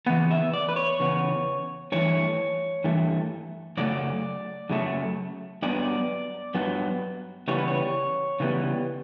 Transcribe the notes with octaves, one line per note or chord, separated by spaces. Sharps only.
E2 C#3 E3 B3 F#5
E5
D5
B4
C#5
E2 C#3 B3
G2 E3 A3 C#5
G2 E3 A3
F#2 C#3 F#3 A3 D5
F#2 C#3 F#3 A3
G2 F#3 B3 D5
G2 F#3 B3
C#3 E3 G3 B3 C#5
B4
C#5
C#3 E3 G3 B3